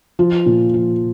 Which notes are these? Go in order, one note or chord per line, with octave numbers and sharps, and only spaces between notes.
F3
A#2
F3